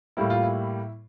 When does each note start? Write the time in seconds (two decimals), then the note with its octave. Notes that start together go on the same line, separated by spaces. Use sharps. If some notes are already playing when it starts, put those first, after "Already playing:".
0.17 A2 G3 A#3 E4
0.30 F4
0.43 E4